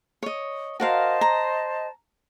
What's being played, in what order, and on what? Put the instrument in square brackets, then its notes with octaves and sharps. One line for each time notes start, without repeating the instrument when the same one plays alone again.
[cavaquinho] C#5 D#5
[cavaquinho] F#4 A#4 F5 [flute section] C5 D#5 A5
[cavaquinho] A#5